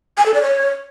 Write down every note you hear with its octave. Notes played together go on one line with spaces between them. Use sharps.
G#5
A4
D5
C#5